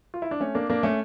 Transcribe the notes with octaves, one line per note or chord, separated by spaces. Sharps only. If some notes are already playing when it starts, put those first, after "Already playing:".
F4
E4
D4
A3 C#4
A#3 D4
A#3 D4
A3 C#4